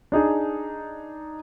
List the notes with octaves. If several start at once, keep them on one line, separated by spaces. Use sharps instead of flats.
D4 D#4 G#4